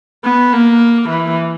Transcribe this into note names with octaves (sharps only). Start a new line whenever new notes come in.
B3
A#3
E3